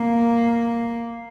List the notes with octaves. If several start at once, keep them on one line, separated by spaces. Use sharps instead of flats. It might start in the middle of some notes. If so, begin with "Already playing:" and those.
Already playing: A#3